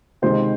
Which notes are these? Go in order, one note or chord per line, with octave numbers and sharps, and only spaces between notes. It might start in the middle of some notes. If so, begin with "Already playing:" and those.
C#2 C3 D#3 C5